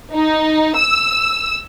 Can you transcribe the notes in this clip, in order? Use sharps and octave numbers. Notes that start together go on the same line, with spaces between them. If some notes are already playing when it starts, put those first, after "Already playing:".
D#4
E6